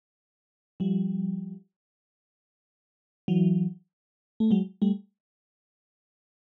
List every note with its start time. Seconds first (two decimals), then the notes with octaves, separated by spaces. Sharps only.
0.80 F3 G3
3.28 E3 F#3
4.40 A3
4.51 F#3 G#3
4.82 G3 A3